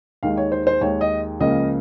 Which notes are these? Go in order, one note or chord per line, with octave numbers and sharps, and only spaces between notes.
D#2 D#3 G#3 F5
C#5
C5
C5
D#2 D#3 G#3 C#5
D#5
C#2 C#3 F3 A#3 D#5